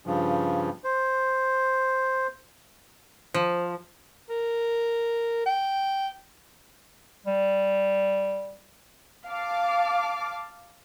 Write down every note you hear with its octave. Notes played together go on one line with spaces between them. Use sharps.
G2 C#3 F3
C5
F3
A#4
G5
G3
F5 A5 D6